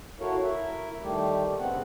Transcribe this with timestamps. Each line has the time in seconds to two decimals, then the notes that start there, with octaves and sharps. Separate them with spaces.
0.20 E4 F#4 A4 A#4 C#5 F5
0.43 E4 A#4 E5
1.02 D#3 G3 A3 G4
1.59 G2 C#3 B3 C4 F#5